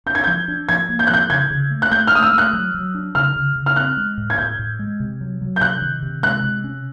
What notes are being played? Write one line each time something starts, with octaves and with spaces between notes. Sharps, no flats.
D4 G6
G#6
F3 G6
D4
F3 G#6
A#3
G6
F#6
F3 G6
C#3 G#6
C#3
A3
F#6
A3 G6
F6
A3 D#6
E6
A3 F#6
F#3
F#3
D4
C#3 F6
C#3
C#3
F6
C4 F#6
G#3
A2
G#6
A2 G6
A2
G#3
C3
F#3
F#3
G6
C3 F#6
D#3
C3
G#3 F#6
C3
C#4